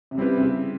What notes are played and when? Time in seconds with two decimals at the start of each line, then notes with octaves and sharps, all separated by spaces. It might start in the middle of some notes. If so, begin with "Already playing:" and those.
0.11 C3
0.17 C#3 G3 C4 E4 G4 B4
0.37 C3
0.42 C#3